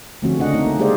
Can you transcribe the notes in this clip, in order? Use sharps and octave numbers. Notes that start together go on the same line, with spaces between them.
D3 F3 A3 C4 C#4 F#4
C#3 D4 D#5 F#5
A3 C4 C#4 D#4
A#3
G#3 G4 G#4 C5 D5 F5